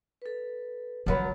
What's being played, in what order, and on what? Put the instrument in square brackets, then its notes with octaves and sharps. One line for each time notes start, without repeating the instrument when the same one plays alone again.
[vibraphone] A4 B4
[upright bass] C#3 G#3 [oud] F3 F#3 B4